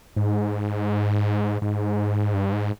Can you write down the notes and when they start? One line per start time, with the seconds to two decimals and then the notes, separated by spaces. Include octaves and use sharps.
0.16 G#2
1.62 G#2
2.34 G2
2.52 G#2